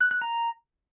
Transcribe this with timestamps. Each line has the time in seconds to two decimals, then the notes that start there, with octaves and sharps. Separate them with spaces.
0.01 F#6
0.11 F#6
0.22 A#5